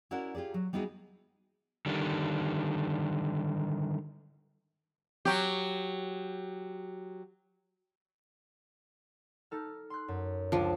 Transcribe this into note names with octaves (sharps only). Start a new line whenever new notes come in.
C#4 E4 F#4 A#4 D5 F#5
F4 G4 G#4 D5
F#3
G3 B3 D#4 E4 F#4 G#4
D3 D#3 G3
F#3 G4
D#4 A4 F6
C6 F#6
F#2
C#2 F3 D4